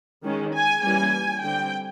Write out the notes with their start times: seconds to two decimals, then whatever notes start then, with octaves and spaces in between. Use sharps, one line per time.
0.23 D#3 G#3 C#4
0.54 G#5
0.83 E3 G3 A#3 C#4 G#5
1.43 D3 G3 C4 G5